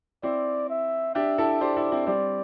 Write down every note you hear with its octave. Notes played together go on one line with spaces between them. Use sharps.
C4 E4 D5
E5
D4 G4 E5
E4 A4
G4 C5 D5
E4 A4
C4 E4
G3 C4 D5